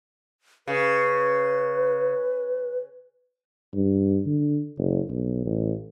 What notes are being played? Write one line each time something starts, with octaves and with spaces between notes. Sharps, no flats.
C#3 B4
G2
D3
F#1
B1
A1